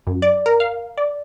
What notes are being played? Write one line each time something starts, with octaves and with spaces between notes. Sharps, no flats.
F#2
D5
A#4
F5
D5